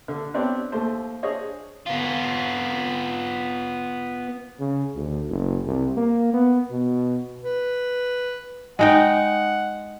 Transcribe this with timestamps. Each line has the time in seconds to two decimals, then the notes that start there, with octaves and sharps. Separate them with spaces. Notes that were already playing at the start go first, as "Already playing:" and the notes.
0.08 D3
0.34 B3 C4 D4 G4 C#5
0.72 D#2 A3 C5
1.23 D4 G#4 C5 C#5 D#5
1.87 B3 F4
4.60 C#3
4.96 D2
5.30 F#1
5.67 C2
5.97 A#3
6.33 B3
6.71 B2
7.44 B4
8.79 G#3 D#4 F#5 G5